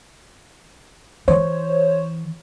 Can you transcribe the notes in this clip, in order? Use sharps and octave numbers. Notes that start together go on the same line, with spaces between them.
E3 C5 C#5